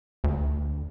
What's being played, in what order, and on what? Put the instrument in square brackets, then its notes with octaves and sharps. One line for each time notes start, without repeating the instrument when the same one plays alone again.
[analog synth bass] D2